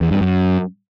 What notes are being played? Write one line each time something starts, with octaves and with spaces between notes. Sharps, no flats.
E2
G2
F#2